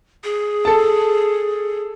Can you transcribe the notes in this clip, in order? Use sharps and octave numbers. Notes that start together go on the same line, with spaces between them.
G#4
A4 A5